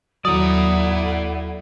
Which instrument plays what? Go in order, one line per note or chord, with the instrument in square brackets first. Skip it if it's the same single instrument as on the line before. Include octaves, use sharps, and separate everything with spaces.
[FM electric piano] D#2 F#3 [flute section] E4 A4 F#5 [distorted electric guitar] D5 A#5 [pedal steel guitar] D#6